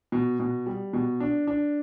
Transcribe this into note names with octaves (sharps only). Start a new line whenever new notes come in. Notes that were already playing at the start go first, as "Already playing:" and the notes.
B2
B2
G3
B2
D4
D4